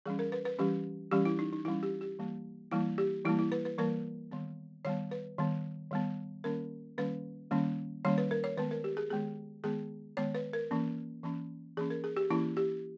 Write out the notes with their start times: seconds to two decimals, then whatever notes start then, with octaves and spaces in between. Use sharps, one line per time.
0.06 E3 G3 C#4 G#4
0.19 A#4
0.32 B4
0.45 B4
0.59 E3 G3 C#4 G4
1.12 E3 G3 C#4 G4
1.25 E4
1.39 D#4
1.53 D#4
1.65 E3 G3 C#4 E4
1.83 G4
2.01 G4
2.19 E3 G3 A#3
2.72 E3 G3 A#3 E4
2.98 G4
3.25 E3 G3 A#3 E4
3.39 E4
3.52 B4
3.65 B4
3.78 E3 G3 A#3 A#4
4.31 D#3 G3 B3
4.85 D#3 G3 B3 C#5
5.11 B4
5.38 D#3 G3 B3
5.91 D#3 G3 B3
6.44 D#3 G3 A#3 C#4 A#4
6.98 D#3 G3 A#3 C#4 B4
7.51 D#3 G3 A#3 C#4
8.05 D#3 G3 A#3 C#4 C#5
8.18 B4
8.31 A#4
8.44 C#5
8.58 D#3 G#3 B3 B4
8.71 A#4
8.84 G4
8.97 G#4
9.11 D#3 G#3 B3 G#4
9.63 D#3 G#3 B3 G#4
10.17 D#3 G#3 B3 C#5
10.35 B4
10.53 A#4
10.71 E3 A#3 C#4
11.23 E3 A#3 C#4
11.77 E3 A#3 C#4 G#4
11.90 A#4
12.04 G#4
12.17 G4
12.30 E3 A#3 C#4 E4
12.57 G4